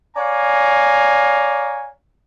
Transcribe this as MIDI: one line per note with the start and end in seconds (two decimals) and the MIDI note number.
0.16 1.89 73
0.16 1.89 74
0.16 1.89 77
0.16 1.89 80
0.16 1.89 82